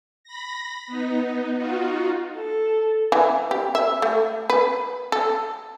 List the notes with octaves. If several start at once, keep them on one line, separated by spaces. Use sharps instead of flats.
B5 A#6
B3 D#4
D#4 F4 F#4
A4
E3
G4
E5
A3
B4
A4